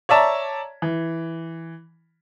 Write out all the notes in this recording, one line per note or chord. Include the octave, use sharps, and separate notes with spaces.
C#5 D5 E5 A5 A#5
E3